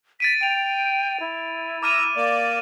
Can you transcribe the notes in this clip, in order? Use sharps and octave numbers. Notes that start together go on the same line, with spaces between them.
A6 B6 D7 D#7
G5 D7 F7
E4
A#5 D6 E6 F6 D#7
A#3 D5